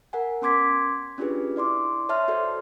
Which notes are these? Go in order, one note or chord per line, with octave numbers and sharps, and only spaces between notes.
A#4 F#5 G#5
B3 C#4 C6 D6 G#6 B6
C#4 D4 F4 G4 G#4 B4
E4 D5 C6 D6
C#5 E5 A5 C6 F6
F#4 A4 C5 D5